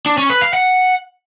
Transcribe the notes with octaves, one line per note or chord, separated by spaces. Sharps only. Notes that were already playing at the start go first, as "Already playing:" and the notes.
D4
C#4
B4
F5
F#5